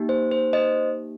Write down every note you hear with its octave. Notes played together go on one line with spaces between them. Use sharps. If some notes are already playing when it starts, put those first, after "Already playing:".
Already playing: A#3 D#4 G4
C5
C5
C5 D#5